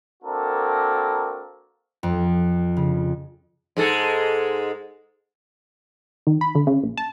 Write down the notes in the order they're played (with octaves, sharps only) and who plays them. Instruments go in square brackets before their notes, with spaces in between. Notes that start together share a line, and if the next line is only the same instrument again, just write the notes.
[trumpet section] A#3 C4 D4 F#4 A4 A#4
[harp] F2
C#3
[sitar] G#2 G#3 A4
[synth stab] D#3
B5
D3
C#3
A#1
A5